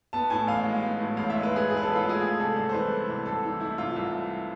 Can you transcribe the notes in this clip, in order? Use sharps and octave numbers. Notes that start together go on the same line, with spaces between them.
B3 A5
A2 G#5
A1 F5
G#3
B3
A2
A1 F5
E5
G#3
B4
B3 G#4
A2 G#4
B4
A1 A4
F4
G#3 G#4
A3 G#4
G#4
C3 A4
C2 A4
C5
E3 B4
A3
C3
C2 A4
E3
A3 E4
C3 F4
C2